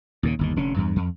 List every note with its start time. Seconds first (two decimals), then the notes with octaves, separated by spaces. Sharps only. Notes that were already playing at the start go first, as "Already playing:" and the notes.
0.23 D#2 A#2 C#3
0.39 G1 D#2 D#3
0.56 F1 D3 C#4
0.76 E2 G2
0.96 F2